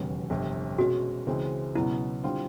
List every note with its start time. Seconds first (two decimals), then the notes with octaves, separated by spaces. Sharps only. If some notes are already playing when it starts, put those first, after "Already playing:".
Already playing: E1 D#2 C#3 F#3 B3
0.30 G1 F2 C3
0.78 B2 G#3 C#4 F#4
1.27 C#2 C#3 E3 G#3 C4
1.75 C#2 B2 F#3 B3 E4
2.24 D3 G3 C4 F4